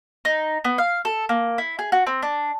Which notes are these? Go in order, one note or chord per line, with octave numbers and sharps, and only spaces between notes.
D#4
B3
F5
A4
A#3
E4
G#4
F#4
C4
D4